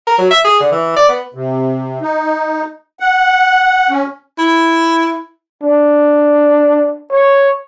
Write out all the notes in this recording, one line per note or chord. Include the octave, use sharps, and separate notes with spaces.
A#4
F#3
E5
G#4
D3
E3
D5
B3
C3
D#4
F#5
C#4
E4
D4
C#5